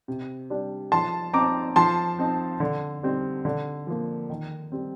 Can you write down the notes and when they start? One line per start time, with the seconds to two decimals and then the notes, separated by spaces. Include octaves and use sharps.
0.08 C3
0.50 G3 D4
0.92 F3 A5 C6
1.34 C4 D#4 A#5 D6
1.76 F3 A5 C6
2.19 C4 D#4
2.60 D3
3.03 G3 C4 D#4
3.45 D3
3.87 F3 A#3
4.30 D#3
4.72 G3 C4